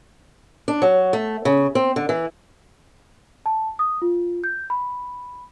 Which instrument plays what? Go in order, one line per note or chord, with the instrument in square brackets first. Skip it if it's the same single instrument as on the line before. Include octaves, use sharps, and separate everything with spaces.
[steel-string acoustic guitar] D4
F#3
A3
C#3
C4
D3
E3
[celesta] A5
D#6
F4
G6
B5